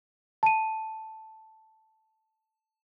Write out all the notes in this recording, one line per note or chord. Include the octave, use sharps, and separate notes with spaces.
A5 D#7